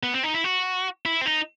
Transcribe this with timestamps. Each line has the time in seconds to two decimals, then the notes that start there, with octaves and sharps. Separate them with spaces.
0.03 B3
0.14 C4
0.24 D#4
0.34 E4
0.44 F#4
1.06 E4
1.21 C4
1.26 D#4